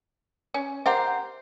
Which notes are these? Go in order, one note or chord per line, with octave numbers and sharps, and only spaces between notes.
C#4
G4 A#4 C5 E5 F#5